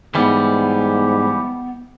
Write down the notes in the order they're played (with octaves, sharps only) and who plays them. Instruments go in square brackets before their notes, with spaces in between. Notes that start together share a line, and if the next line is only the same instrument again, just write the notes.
[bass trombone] G#2 [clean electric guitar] E3 G3 [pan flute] B3